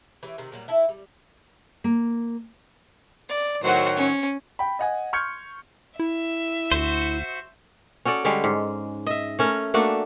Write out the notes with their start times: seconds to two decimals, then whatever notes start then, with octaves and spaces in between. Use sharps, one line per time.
0.23 E3 G4 C#5
0.38 C3 D#3
0.52 A#2 F#3 G3
0.68 E4 A4 E5
0.89 G3
1.84 A#3
3.29 D5
3.63 A2 D#3 F#3 F#4 C5
3.97 C#4
4.59 G5 B5
4.79 D#5 F#5 G#5
5.13 C6 C#6 F6 G6 G#6 C#7
5.99 E4 E5
6.72 D2 F#4 C5
8.05 C#4 F#4 A4 D5
8.25 D3 G3 G#3 C#4
8.44 G#2
9.07 D#5 E5
9.39 A3 C#4 A#4
9.74 A3 A#3 D4 F#4